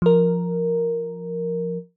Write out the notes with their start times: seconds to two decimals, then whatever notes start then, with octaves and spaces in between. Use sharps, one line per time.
0.02 F3 A#4